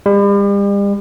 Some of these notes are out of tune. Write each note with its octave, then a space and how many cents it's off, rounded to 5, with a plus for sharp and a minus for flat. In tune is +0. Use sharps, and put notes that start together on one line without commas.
G3 +40